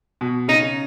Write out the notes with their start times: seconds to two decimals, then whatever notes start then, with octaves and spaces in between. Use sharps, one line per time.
0.21 B2
0.48 C#3 D#4